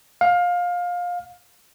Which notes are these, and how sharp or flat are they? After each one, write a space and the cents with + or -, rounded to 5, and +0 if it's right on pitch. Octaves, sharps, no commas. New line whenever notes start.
F5 +20